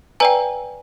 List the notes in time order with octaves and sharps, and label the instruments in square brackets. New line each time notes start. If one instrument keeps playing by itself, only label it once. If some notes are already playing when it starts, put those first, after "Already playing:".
[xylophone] B4 D5 G5 G#5 A#5